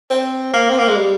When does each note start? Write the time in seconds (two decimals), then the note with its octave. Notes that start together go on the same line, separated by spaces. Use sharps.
0.10 C4
0.53 A#3
0.70 C4
0.79 A#3
0.88 G#3
0.96 G3